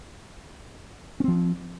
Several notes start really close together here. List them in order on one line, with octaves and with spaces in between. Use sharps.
C#4 C4 F3